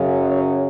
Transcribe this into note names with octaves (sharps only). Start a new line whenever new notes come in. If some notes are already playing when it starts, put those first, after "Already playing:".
Already playing: F#2 C#3 F#3
C#5